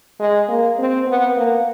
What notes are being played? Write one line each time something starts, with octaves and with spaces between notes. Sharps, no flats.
G#3
A#3
C4
B3
A#3